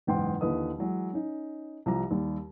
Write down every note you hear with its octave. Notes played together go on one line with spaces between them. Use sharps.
F#1 E2 G#2 G5 C6
D#2 D3 E3 B4 D#5 D#6
E3 F#3 G#3
C#4 D#4
C2 F3 G4 A#5
D#2 D#3 G3